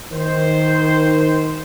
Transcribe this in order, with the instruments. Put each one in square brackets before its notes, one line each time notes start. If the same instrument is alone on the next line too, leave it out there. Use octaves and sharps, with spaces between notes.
[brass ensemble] D#3 C5